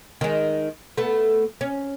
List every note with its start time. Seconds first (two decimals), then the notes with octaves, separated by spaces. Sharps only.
0.21 D#3 G#3
0.97 A3 B3
1.61 C#4